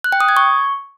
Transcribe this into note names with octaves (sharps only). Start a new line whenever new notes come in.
F#6
G5
D#6
G#6
C#6